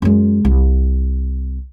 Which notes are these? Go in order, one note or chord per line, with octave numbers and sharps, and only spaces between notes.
F#2 G#3
C2